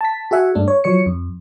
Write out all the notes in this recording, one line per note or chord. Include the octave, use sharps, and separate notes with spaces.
A5 B6
F#4 G#4 E5 F#5 G#5
G2 A3 D4
C#5
F3 F#3 C#5 C#7
F2